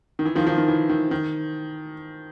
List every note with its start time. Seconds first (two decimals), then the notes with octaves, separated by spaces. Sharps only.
0.19 D#3
0.25 E3
0.35 D#3 F3
0.46 D#3 F3
0.58 D#3
0.68 E3
0.89 D#3
1.11 D#3